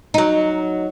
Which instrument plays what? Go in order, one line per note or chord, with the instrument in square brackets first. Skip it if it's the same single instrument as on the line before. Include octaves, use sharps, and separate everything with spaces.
[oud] F#3 D#4